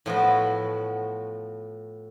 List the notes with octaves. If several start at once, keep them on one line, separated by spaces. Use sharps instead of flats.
A2 F3 B3 F#4